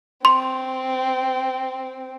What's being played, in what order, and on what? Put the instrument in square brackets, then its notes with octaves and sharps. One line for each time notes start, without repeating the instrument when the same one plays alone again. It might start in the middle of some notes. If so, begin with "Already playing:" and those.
[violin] C4 [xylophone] C6